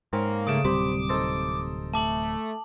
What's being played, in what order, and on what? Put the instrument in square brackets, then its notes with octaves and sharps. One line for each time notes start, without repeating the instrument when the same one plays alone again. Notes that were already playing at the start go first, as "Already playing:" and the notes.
[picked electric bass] G#2 [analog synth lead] A#3 [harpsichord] C4 C#4
[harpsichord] C#3 A3 [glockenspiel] D#6 D7 E7
[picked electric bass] D1 C3 G3 [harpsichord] C5 B5 [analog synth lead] D6
[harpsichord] D#4 A4 C5
[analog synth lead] A3 [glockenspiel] A5 D6 F#7